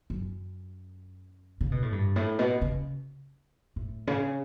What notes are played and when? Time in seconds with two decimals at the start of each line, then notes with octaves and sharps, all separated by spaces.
0.10 F#2
1.61 C#3
1.72 B2
1.82 A2
1.92 G2
2.16 A2
2.39 B2
2.62 C#3
3.76 A2
4.07 C#3